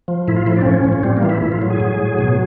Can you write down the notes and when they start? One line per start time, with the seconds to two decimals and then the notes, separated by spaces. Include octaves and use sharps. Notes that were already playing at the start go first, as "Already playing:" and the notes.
0.08 F3
0.28 A2 E4
0.36 F4
0.46 F3 E4
0.56 D4
0.62 C4
0.65 A2 C#4
0.84 A2
0.93 C#4
1.03 G3 C4
1.17 A#3
1.23 E3 F4
1.29 E4
1.42 A2 E4
1.52 F4
1.62 F#3
1.70 G#4
1.80 A2
1.99 F#3
2.19 B2